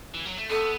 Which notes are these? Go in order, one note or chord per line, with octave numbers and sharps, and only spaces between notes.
E3
F#3
A3
B3 A4